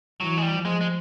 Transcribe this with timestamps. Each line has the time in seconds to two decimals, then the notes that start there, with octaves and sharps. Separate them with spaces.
0.20 E3 F#3
0.37 G#3
0.42 G3
0.53 F3
0.65 G#3
0.81 G#3